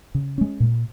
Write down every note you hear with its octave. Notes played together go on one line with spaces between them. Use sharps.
C#3
G#3 C#4
A#2